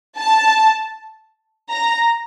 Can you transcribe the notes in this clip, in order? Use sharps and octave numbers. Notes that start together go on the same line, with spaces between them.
A5
A#5